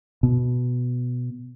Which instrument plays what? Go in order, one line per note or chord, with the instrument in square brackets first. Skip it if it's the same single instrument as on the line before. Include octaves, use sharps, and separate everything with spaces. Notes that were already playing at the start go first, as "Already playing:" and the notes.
[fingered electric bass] B2